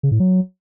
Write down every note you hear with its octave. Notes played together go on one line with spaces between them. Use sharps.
C#3
A2
F#3